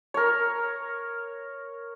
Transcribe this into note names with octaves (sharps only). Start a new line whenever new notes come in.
A#4 C#5